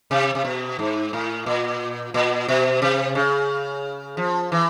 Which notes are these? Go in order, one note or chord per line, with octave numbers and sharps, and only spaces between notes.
C3
C3
B2
G#2
A2
A#2
A#2
B2
C3
C#3
F3
E3